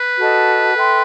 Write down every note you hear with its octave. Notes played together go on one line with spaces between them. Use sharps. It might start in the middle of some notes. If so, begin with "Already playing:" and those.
Already playing: B4
F#4 A4 D#5 A5
A4 E5 G5 C6